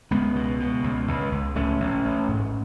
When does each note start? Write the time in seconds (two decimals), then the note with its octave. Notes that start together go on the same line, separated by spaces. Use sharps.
0.11 C#2 G#3 B3
0.35 B2
0.60 B2
0.84 C#2
1.08 C#2
1.32 C#2
1.56 A1 A3 C#4
1.80 A1
2.05 A1
2.28 G#2